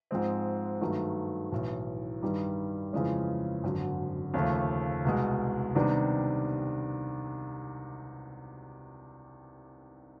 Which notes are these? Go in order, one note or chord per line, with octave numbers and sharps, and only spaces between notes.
G#2 F3 G#3 C4
G2 D#3 F#3 A3
B1 A2 E3
G2 D#3 G3
F2 C#3 E3 G#3 C#4
G#1 F#2 D3
D#2 C#3 F3 A3
C2 B2 G#3
C3 D#3 G3 B3 D4